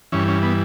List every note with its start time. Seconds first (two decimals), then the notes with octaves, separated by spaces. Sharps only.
0.12 G2 E3 C#4
0.28 C#4
0.43 B3